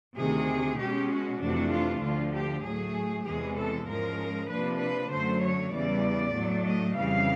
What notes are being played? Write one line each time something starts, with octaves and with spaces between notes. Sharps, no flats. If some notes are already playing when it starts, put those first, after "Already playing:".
D2 C3 D#3 G#4
B2 G#3 C#4 G4
F#4
F2 C3 E3 A3 D4 F#4
F4
D2 D3 F3 F4
G4
A2 F#3 A3 G#4
E2 C3 E3 G#3 G#4
A4
G#2 F3 G#3 C#4 A#4
C3 F3 A#3 D4 B4
B4
F#2 D3 F#3 A3 C5
C#5
E2 C#3 E3 G3 D5
A2 F#3 A3 D4
D#5
F2 C#3 E3 G3 F5